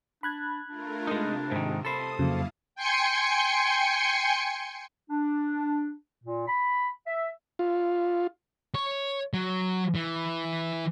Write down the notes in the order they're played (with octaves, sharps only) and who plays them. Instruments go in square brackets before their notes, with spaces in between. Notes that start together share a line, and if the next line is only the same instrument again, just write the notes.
[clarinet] D4 [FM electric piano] B5 F#6 G#6
[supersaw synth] A3 F4 A#4 [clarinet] D4
[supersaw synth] C3 [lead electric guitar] G#3 D#4
[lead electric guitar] G#2 D#3
[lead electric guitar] A4 C5 [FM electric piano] A5 B5 [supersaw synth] D#6
[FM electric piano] F2 C#3 F#3 [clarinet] A#3 [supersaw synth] E4 F5 A5
[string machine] G5 G#5 C6 C#7
[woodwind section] D4
A#2
B5
E5
[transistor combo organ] F4
[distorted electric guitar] C#5
F#3
E3